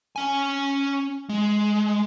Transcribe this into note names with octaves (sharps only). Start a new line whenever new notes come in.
C#4 G#5
G#3